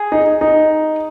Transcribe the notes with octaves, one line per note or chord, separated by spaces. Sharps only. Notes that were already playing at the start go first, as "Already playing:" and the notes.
Already playing: G#4
D#4
D#4